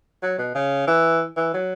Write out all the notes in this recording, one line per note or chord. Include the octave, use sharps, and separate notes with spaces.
F#3
B2
C#3
E3
E3
F#3